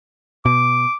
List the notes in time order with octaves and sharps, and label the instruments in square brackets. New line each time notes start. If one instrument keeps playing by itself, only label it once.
[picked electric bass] B2 [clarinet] D6